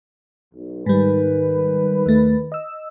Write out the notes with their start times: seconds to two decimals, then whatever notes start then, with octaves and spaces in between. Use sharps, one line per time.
0.54 B1
0.86 G#2 D#3 G3 B4
2.06 D#2 A3
2.52 D#5 E6